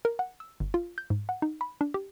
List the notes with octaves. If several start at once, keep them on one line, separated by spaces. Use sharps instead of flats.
A#4
F#5
E6
G1
F4
G6
G#2
F#5
D#4
B5
D4
G4